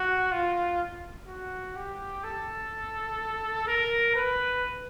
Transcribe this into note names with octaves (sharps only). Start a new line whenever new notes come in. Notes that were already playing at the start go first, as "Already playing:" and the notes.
Already playing: F#4
F4
F#4
G4
A4
A#4
B4